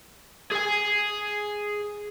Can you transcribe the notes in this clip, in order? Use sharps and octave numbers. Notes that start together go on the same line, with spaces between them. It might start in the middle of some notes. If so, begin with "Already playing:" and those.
G#4 G#5